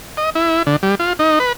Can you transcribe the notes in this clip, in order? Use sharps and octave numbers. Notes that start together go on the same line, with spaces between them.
D#5
E4
D3
G3
F4
D#4
B4